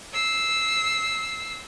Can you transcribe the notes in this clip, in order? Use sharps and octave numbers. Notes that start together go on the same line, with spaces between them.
E6 C7